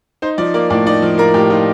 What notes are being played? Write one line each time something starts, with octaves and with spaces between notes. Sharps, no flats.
D#4 C5
F3 D5
A#3 D5
A2 D5
D#4 D5
F3
A#3 A#4
A2 G4
D#4 F4